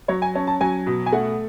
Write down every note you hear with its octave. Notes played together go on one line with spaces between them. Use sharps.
F#3 C#5
G#5
C#4 A5
A5
F#3 G#5
B2
G#5
A3 F#5